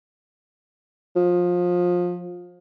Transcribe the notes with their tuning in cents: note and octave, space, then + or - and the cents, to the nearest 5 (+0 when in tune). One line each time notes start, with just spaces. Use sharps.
F3 +25